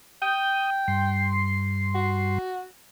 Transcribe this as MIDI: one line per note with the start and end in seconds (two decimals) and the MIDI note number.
0.22 1.36 79
0.22 0.70 87
0.22 0.70 91
0.88 2.38 43
0.88 2.38 84
1.95 2.64 66